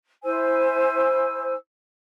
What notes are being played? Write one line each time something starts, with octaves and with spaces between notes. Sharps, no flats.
E4 C5 G#5 E6